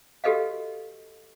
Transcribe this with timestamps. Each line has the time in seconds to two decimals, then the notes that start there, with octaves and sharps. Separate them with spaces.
0.24 F#4 G4 A4 B4 D#5 F5